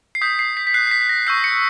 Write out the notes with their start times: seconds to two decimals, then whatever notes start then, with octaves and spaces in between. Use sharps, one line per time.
0.15 C7
0.21 D#6 G6 B6
0.39 C7
0.57 B6
0.67 B6
0.74 D#6 F#6 C7
0.87 C7
0.91 B6
1.02 B6
1.09 A#6
1.27 C#6 E6 G6 C7
1.44 C#7